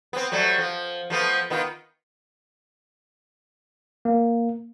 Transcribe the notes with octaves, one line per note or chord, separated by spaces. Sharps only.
B3 C4
F#3 G3 A3
F3
F3 A3 B3
D#3 B3 F4
A#3